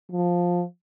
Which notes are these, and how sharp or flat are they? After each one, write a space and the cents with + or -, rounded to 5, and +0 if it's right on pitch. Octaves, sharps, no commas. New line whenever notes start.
F3 +10